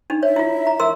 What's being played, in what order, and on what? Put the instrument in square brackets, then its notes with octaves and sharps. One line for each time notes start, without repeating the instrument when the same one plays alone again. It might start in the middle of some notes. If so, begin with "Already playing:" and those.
[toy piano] D4 D#4
[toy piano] C#5 [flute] E5
[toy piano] E4 F4
A#5
A#4 C6 E6